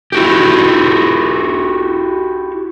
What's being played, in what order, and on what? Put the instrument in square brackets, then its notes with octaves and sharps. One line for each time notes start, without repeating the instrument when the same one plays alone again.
[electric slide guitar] E4 F#4 G4